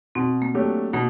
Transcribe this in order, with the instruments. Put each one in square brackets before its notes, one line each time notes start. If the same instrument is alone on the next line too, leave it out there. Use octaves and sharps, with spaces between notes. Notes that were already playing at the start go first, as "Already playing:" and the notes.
[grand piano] B2 [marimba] C4
[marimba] A#3
[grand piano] F#3 A3 D4 G4
[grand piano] B2 [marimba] A#3